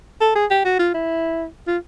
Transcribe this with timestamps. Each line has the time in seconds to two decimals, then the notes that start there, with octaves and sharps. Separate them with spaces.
0.21 A4
0.35 G#4
0.50 G4
0.65 F#4
0.79 F4
0.94 E4
1.67 F4